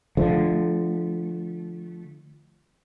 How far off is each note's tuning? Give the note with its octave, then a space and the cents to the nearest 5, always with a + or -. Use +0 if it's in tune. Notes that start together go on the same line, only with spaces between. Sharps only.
D3 +10 F3 -15 A3 -30